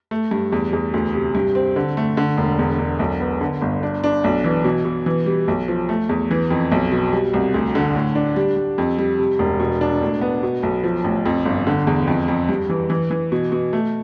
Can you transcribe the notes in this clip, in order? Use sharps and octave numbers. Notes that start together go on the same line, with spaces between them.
A3
G2
E2
E2
D2
C3
G2
C4
D3
A3
D3
E1
E2
E1
B1
B3
D3
G1
D4
D4
B1
E3
B2
B2
E3
G3
B1
F3
A3
E2
E3
F2
B1
B2
G3
C2
D2
D3
A2
D4
G3
G3
F2
G3
C3
E1
B2
D4
A2
B3
B2
B1
F3
A1
F2
G1
D3
E2
F2
F2
G2
E3
E3
E3
B2
B2
A3